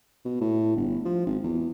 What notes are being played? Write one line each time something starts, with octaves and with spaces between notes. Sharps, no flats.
B2
A2
G1
F3
G#1
E2